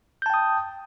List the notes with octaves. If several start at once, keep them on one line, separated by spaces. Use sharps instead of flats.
G5 A5 D#6 G6